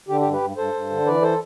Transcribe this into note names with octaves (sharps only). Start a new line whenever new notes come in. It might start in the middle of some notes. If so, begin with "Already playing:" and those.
D3 G4
G4
G2
G4 B4
G2
G2 A4 C5
G2
D3
E3 B4 D5
A4 C5